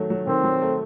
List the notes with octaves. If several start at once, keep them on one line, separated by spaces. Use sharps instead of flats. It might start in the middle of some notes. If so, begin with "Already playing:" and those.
Already playing: D#3 F#3 A3
F#3
D#3 C4
F#3
A3